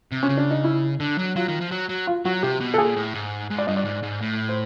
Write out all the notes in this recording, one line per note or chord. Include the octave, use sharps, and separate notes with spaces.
C3
C#4
C#3
D4
D#4
E4
D3
F#3
F#3 F4
D#3
F3
F#3
F#3
F4
F#3 F#4
C3 G4
B2
A4
A#2 G#4
A2
G#2
G#2
D5
G2 D#5
D5
G#2
G#2
A2
C5